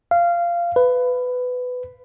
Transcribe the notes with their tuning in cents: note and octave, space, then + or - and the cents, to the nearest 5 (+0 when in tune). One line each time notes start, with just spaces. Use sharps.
F5 -15
B4 +15